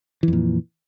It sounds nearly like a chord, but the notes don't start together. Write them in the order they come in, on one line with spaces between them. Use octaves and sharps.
E3 F2 A#2